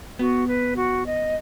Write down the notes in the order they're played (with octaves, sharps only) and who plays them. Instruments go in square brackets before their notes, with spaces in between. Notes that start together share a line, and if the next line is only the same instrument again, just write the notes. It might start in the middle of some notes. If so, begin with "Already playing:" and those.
[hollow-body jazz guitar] B3 [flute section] F#4
[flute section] B4
F#4
D#5